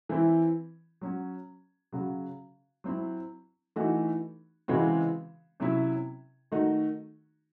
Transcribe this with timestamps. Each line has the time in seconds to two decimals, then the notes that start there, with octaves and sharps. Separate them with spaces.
0.09 E3 C4 E4
1.02 F#3 C#4 F#4
1.93 C#3 F#3 C#4 F#4
2.84 F#3 C4 E4
3.76 E3 A3 D#4 F#4
4.68 C#3 E3 G#3 C4 F#4
5.60 C3 F#3 C#4 E4
6.52 D#3 A3 D#4 F#4